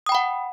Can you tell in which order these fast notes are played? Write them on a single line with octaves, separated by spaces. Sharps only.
D#6 G5 B5 F#5